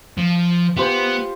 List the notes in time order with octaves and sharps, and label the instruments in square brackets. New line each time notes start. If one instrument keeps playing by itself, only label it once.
[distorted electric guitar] F3
[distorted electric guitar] B3 [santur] F4 G4 C5